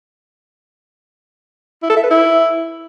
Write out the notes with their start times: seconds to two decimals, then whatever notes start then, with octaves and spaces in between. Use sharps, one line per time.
1.83 E4
1.89 A4
1.96 E5
2.03 B4
2.10 E4